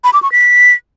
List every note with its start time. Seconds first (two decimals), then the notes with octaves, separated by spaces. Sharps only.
0.04 B5
0.13 D6
0.23 C#6
0.32 B6